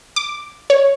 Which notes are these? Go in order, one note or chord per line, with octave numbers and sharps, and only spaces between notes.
D6
C#5